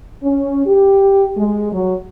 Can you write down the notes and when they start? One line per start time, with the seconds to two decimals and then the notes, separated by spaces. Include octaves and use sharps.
0.23 C#4
0.67 G4
1.37 G#3
1.73 F#3